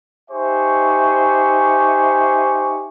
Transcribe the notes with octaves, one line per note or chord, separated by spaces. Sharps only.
D#4 G4 C5 E5 G#5 C#6